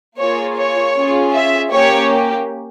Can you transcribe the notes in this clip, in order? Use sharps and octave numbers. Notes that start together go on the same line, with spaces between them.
A#3 F4 G#4 C#5
C#5
C#4 F4 G#4
E5
A#3 C#4 G4 C#5